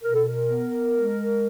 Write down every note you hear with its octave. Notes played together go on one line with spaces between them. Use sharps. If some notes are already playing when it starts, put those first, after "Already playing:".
B2 A#4
A4
A#4
B3
G#3